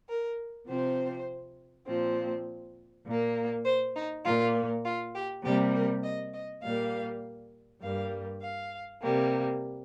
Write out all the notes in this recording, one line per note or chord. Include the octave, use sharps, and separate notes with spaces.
A#4
C3 F3 C4 C5
A#2 F3 C4
A#2 A#3
C5
D#4
A#2 A#3 F4
F4
G4
C3 G3 A#3 G4
A#4
D#5
D#5
A#2 G3 A#3 F5
G2 G3 A#3 F5
F5
C3 G3 A#3